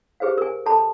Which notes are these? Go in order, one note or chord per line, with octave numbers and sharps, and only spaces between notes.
G4 G#4 B4 C5 F5
A#4 G#5
A4 A5 B5